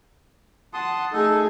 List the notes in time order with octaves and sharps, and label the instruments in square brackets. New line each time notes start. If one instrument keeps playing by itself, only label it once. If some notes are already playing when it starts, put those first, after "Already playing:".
[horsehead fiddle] F#5 [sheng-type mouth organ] A5 C6 D#6
[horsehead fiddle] A3 G#4 [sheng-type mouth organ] D#4 A4